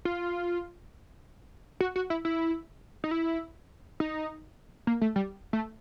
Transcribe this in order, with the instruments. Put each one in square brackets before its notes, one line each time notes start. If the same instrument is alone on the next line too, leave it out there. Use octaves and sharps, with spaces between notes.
[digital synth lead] F4
F#4
F#4
E4
E4
D#4
E4
D#4
A#3
A3
G3
A3